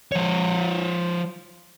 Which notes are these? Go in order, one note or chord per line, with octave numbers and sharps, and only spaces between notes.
F3 C#5